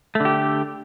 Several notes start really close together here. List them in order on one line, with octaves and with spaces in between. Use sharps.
A3 D3 G4